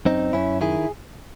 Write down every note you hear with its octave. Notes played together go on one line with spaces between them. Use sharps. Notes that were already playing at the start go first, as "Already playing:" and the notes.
F#2 C4 D#4
F#2 C#4 E4
D#3 E4 G#4